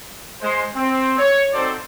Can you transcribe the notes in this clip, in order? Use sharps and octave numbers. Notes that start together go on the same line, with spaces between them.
G#3 C5
C4
C#5
C4 D#4 F#4 A4 C5 D5